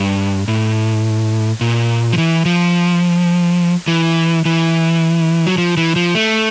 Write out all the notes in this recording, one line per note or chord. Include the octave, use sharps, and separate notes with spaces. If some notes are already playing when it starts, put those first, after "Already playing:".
Already playing: G2
A2
A#2
F3
E3
F3
E3
E3
F#3
F3
E3
F3
A3